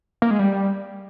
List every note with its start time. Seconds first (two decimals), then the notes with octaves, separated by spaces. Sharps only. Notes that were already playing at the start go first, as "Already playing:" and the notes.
0.22 A#3
0.31 G#3
0.39 G3